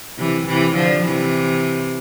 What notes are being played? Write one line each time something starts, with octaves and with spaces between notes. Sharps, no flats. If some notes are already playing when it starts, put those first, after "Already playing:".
C3 E3
C3 E3
D3 F3
C3 E3